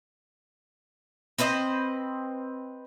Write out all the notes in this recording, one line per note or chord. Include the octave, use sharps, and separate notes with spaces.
C4 B4 C5 D#5